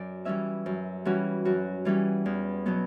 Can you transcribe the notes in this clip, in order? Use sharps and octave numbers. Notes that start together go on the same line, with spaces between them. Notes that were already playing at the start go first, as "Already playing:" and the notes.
Already playing: F#2 D5
E3 G3 C#4 E5
F#2
E3 G3 C#4 F#4
F#2 F#4
E3 G3 C#4
E2
B2 F#3 B3